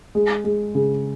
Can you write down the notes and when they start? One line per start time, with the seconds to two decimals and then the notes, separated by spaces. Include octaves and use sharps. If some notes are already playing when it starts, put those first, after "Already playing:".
0.15 G#3
0.44 G#3
0.75 C#3